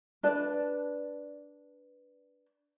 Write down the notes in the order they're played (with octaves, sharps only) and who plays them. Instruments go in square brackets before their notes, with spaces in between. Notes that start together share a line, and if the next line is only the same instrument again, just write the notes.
[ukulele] D4 B4 D5 A5